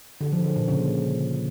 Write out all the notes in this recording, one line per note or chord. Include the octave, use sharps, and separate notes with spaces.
D3
F3
D3
A#2
C#3